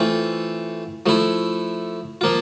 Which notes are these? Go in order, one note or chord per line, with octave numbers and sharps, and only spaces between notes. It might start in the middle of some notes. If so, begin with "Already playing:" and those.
Already playing: E3 A3 C4 F4
F3 A3 E4
F3 A#3 F4